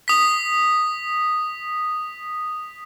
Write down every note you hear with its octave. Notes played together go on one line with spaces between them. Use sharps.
D#6 B6